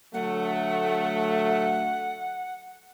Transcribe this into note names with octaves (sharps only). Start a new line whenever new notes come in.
D3 F#3 A3 F#5